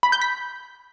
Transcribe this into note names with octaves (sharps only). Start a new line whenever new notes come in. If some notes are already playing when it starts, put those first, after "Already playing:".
B5
G6
B6